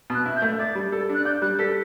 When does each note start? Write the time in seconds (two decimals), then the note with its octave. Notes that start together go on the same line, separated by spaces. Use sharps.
0.10 B2
0.15 F#6
0.26 E4
0.36 G6
0.42 A3
0.59 D5 A6
0.75 G3
0.92 A4
1.09 D4
1.15 F#6
1.25 D5 G6
1.42 G3 F#6
1.59 A4 B6